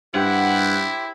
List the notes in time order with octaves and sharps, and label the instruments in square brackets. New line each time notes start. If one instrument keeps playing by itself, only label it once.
[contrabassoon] G2 [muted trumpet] E4 [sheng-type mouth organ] G4 C5 [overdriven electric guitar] F#5